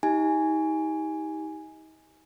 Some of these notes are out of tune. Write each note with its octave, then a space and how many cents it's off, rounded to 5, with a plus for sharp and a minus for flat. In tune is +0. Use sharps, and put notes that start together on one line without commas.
D#4 +35 G4 +0 G#5 +0